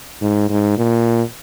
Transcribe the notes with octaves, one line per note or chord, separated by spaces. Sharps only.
G#2
G#2
A#2